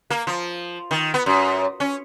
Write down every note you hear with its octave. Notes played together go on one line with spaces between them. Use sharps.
A#3
F3
D#3
B3
F#2
C#4